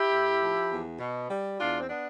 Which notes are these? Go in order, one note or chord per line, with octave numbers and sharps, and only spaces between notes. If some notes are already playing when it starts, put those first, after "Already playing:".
Already playing: E4 G4
A2
F3
E2
B2
G3
E2 D4 F4
C4
B3 D4